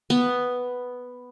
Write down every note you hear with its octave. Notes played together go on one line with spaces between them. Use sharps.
B3